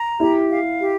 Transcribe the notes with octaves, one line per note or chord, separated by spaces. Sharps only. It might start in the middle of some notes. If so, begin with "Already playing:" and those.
Already playing: A#5
E4 G4
F5
G4